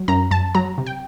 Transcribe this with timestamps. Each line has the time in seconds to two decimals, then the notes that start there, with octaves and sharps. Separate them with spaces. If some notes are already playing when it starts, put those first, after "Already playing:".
Already playing: F#3
0.08 F#2 A#5
0.31 F#2 A5
0.55 F#3 A#5
0.78 C3
0.86 G5